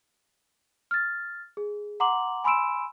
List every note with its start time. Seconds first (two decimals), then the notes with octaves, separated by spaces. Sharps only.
0.91 F6 A6
1.57 G#4
2.00 F#5 A#5 C6 D6 F#7
2.44 G#5 B5 C6 E6 D7 E7